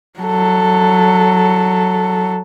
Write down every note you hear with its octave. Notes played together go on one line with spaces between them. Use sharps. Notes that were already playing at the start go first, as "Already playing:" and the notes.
F#3 A4